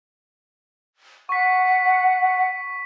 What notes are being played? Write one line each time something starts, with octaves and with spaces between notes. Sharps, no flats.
F#5 C#6 B6